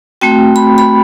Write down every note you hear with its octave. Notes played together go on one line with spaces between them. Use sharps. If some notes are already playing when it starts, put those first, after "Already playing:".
A3 C4 F#4 G5
B5
B5